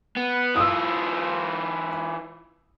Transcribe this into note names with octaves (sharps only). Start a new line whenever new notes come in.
B3
E3 F4 D#6 E6